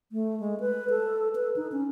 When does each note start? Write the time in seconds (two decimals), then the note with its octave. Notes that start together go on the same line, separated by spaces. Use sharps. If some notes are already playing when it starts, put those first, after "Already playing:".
0.12 A3
0.40 G#3
0.60 B4
0.90 A4
1.35 B4
1.56 D#4
1.72 C#4